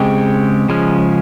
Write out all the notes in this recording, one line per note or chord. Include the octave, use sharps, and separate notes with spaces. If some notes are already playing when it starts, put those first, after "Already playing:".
Already playing: C#3 G#3 C4 G4 C#5
C#3 F3 G#3 C#4